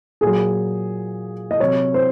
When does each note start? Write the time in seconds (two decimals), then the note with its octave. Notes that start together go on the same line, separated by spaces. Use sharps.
0.21 A#2 F#3 G#4
1.51 D#5
1.59 C3 F#3 C#5
1.94 C5